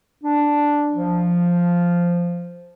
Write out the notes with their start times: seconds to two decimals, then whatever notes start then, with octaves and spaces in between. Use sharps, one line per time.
0.23 D4
0.92 F3